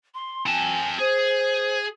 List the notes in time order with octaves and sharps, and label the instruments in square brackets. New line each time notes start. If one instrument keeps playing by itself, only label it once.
[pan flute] C6
[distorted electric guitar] C4 A5 [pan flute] G#5
[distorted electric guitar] G#4 [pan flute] C5